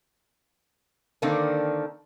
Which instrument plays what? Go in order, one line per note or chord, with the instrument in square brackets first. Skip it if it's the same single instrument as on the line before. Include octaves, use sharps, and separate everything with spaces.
[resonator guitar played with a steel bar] D3 D#3 A#3 C4 D4